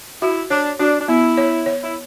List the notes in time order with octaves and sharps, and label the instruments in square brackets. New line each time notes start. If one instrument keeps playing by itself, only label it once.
[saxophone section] E4 [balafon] F#4
[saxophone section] D4 [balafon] C#5
[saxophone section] D4 [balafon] F#4
[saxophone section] D4
[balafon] B3 [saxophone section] E4
[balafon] C#5
C#5
[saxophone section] E4